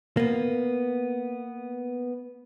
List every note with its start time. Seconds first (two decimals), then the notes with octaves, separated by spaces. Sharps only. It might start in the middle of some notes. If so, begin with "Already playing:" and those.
0.17 A#3 B3